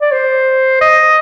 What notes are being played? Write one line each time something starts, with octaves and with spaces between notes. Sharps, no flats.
D5
C5
D#5